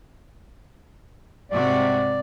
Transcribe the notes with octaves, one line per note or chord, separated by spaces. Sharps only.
G#2 C3 F#4 D5